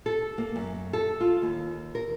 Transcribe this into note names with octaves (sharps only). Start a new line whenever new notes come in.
A4
A#3
F#2
A4
F4
D#2
A#4